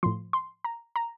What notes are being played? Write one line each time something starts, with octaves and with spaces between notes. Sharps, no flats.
A2 F3 C6
C6
A#5
A#5